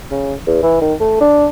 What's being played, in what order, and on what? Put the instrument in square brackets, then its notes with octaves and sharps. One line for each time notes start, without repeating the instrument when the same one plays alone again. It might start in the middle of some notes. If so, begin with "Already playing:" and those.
[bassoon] C#3
E2
E3
D#3
A3
D4